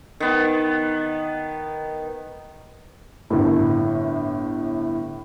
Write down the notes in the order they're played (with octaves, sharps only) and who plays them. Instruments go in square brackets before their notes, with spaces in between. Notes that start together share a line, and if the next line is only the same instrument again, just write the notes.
[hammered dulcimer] D#3 B3
[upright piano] G1 A2